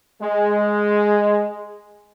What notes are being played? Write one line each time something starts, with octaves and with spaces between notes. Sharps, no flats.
G#3